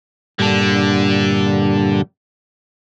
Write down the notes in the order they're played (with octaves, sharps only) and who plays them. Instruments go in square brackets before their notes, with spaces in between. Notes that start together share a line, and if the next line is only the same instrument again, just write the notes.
[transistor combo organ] G2 A#2 G3 [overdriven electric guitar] D3 D4